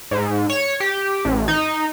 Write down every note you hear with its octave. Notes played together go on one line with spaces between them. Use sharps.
G#2
C#5
G4
A1
D#4